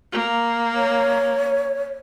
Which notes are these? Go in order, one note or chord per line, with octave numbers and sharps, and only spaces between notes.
A#3
C#5